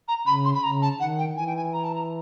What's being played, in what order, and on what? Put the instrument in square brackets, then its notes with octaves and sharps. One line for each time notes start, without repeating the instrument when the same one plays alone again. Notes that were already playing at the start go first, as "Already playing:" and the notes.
[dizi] A#5
[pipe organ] C#3 [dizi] B5
[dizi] C6
B5
[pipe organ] C#3 [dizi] A#5
[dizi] A5
[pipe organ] D#3 [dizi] F#5
[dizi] G5
[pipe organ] E3 [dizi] G#5
[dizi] G5
G#5
A#5
A5
A#5